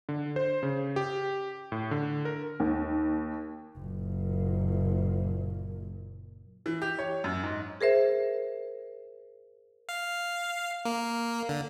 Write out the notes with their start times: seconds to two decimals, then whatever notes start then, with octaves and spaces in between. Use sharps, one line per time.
0.09 D3
0.36 C5
0.63 C#3
0.96 G4
1.72 A2
1.91 D3
2.25 A#4
2.60 D#2
3.78 F#1 A#2
6.66 E3
6.82 G4
6.99 C#5
7.24 F#2
7.43 G#2
7.81 G#4 A#4 C5 E5
9.89 F5
10.85 A#3
11.49 D3